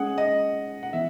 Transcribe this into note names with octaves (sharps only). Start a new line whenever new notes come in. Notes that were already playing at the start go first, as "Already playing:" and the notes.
Already playing: G#3 C#4 G#4 F#5
D#5
F#5
E3 B3 E5